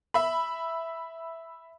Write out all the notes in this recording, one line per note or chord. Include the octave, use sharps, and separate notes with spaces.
E5 B5